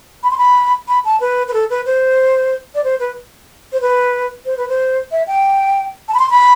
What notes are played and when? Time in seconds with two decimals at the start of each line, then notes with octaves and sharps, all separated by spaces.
0.23 B5
0.31 C6
0.38 B5
0.88 B5
1.05 A5
1.20 B4
1.48 B4
1.53 A4
1.70 B4
1.86 C5
2.75 D5
2.84 C5
3.00 B4
3.72 C5
3.81 B4
4.45 C5
4.57 B4
4.68 C5
5.11 E5
5.27 G5
6.08 A5
6.14 B5
6.19 C6
6.30 B5